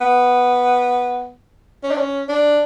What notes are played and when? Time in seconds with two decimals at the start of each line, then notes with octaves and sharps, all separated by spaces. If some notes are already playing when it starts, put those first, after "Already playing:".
0.01 B3
1.83 C#4
1.91 D4
1.97 C#4
2.29 D4